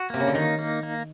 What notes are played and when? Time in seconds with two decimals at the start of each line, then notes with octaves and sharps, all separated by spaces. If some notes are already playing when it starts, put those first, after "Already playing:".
Already playing: F#4
0.10 C3 A#3
0.20 C#3
0.28 D3
0.34 D#3 D#4
0.59 A#3
0.83 A#3